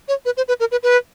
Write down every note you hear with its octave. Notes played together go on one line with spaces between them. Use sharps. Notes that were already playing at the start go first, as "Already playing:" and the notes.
C#5
B4
C5
B4
A#4
B4
B4